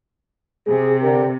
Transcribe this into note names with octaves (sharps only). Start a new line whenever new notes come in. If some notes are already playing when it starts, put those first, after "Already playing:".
C3 G#4
D3 G4 A#4